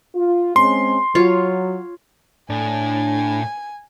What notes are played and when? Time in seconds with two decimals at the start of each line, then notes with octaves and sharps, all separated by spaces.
0.15 F4
0.56 G#3 C4 C#4 C6
1.15 F#3 F4 C#5
2.50 A2 D4 G#5